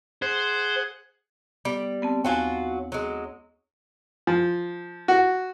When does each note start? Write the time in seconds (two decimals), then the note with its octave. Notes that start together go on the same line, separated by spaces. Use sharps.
0.22 G#4 C5 F#5
1.65 G3 B3
2.02 B3 C4 A5
2.25 D#2 F#3 F4 F#4 G#5
2.92 F#3 G#3
4.27 F3
5.08 F#4